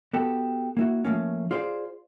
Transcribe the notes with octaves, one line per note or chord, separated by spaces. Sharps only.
B3 F#4 G4 A4
A#3 E4 F#4
F3 A3 A#3 C#4
F4 G#4 C5 D5 F5